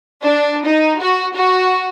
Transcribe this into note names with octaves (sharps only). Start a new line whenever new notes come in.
D4
D#4
F#4
F#4